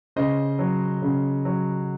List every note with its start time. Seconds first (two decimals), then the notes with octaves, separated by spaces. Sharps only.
0.16 C#3 C5 D#5
0.59 F#3
1.02 C#3
1.45 F#3